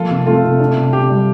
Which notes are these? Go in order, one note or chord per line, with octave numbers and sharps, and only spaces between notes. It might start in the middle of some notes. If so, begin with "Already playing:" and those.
Already playing: F3 A#3 F4 A4
C3
A3 F4
C3
D4
C3
C3 G4
G3